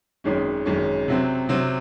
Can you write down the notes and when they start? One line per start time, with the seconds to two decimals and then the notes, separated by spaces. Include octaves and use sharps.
0.24 G#1 F#2 D#3 G#3 C#4
0.65 G#1 F#2 D#3 G#3 C#4
1.08 C3 F#3 C4
1.49 C3 F#3 C4